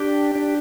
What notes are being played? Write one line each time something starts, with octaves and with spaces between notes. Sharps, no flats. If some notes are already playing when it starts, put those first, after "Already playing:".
Already playing: D4 G4
D4